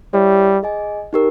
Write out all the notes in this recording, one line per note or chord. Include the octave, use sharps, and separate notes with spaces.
G3 E4 G4 C#5 E5
G#4 D#5 G#5
D#4 G4 A#4